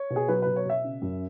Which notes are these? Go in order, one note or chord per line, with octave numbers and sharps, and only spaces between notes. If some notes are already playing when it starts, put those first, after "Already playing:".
Already playing: C#5
B2
G#4
F#3 B4
B2 B4
C#5
B2 E5
C#3
F#2